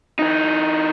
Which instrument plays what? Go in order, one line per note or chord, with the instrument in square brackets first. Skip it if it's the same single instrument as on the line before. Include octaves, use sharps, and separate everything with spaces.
[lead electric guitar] E3 D#4